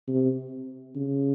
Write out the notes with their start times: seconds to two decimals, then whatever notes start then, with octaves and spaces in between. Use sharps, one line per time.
0.08 C3
0.96 C#3